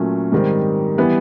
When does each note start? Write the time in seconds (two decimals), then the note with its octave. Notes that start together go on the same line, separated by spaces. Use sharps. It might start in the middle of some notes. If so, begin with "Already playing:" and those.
Already playing: A#2 F#3 A3 C#4
0.32 G#2 D#3 G3 C4
0.98 E3 G3 B3